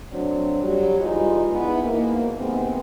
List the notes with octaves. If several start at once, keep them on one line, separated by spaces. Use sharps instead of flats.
F#3 A3 C4 D4
F#3 G3
E3 G3 G#3 D#4 F4
G#3 B3 D#4 E4
G#2 B2 A#3
C3 D#3 G#3 B3 C4